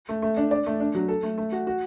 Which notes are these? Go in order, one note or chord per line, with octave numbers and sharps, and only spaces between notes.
A3
A3
D4
D5
A3
D4
F#3
A4
A3
A3
F#4
F#4